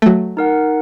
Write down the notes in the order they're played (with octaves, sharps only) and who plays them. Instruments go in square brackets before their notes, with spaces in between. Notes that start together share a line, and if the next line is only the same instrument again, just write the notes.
[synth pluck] F#3 A3
[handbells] D#4 A#4 F#5